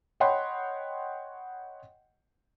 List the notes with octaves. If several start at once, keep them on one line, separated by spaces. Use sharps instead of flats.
C#5 D#5 F#5 G5 B5 C6